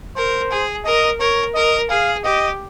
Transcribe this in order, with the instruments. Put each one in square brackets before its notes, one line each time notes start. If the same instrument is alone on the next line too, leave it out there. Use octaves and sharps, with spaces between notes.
[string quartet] A#4 [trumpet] C5
[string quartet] G#4
[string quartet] A#4 [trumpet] D#5
[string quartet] A#4 [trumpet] C#5
[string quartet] A#4 [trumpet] D#5
[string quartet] G#4 [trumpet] F5
[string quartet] G4 [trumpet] D#5